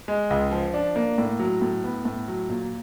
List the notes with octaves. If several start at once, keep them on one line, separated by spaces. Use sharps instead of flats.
G#3
C#2
F3
D4
A#3
A2
F#3
A2
B3
A2
F#3
A#2